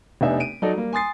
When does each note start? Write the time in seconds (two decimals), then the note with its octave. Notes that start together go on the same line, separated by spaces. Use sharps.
0.21 F1 B3 D4 D#4 E5 G#5
0.40 D7 D#7
0.62 F#3 D#4 A4 D5
0.74 G3 A#3
0.93 G#5 C6 D#6 A6 C7